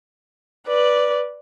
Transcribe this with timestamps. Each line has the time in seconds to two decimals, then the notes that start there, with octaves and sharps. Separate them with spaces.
0.67 B4 D5